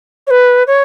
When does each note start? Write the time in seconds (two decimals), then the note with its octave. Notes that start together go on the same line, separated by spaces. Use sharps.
0.27 C#5
0.30 B4
0.67 C#5